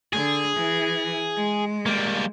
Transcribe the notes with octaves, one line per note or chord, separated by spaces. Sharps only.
D3 G#4
E3
G#3
G3 A#3